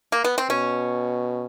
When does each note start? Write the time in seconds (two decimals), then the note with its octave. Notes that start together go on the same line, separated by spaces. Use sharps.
0.12 A#3
0.24 B3
0.38 C4
0.50 B2 C#4